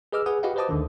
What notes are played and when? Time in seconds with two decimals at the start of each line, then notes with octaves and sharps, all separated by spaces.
0.13 G#4 B4 D#5 D6 E6 F6
0.26 G#4 B4 F#5 G#5 D#6
0.43 F#4 G4 B4 D#5 F5 F#5
0.56 B4 C5 D#5 A5 D6 D#6
0.69 D2 D3 D#3